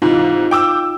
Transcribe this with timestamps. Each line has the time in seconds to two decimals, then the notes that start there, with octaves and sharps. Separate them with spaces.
0.02 G#2 C3 E3 D#4 F4
0.51 G5 D6 E6